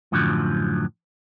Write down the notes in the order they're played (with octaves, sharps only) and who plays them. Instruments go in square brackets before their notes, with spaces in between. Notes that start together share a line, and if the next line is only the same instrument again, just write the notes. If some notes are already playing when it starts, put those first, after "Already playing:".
[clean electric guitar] F#2 A2 D3 F3 F#3